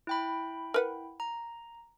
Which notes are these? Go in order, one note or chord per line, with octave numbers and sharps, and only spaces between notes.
E4 G5 B5
A#4 B4 F#5
A#5